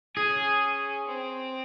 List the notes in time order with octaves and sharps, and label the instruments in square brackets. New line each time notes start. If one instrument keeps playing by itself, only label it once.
[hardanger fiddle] C#4 [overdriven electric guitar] G#4
[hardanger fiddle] C4